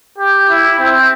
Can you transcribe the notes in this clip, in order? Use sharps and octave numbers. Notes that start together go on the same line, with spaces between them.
G4
E4
C4